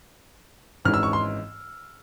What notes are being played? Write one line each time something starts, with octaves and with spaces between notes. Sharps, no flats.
G#1 G#2 E3 G#3 C#4 F6
E6
C#6
C6